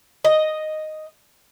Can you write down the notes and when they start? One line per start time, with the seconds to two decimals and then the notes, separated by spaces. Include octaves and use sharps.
0.25 D#5